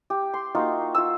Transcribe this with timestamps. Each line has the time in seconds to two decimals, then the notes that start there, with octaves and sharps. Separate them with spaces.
0.10 G4
0.34 C6
0.55 A#3 D#4 F4 F#4
0.95 F4 E6